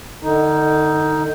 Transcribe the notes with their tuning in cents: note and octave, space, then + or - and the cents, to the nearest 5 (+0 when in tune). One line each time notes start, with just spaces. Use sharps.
D3 +40 D#4 +10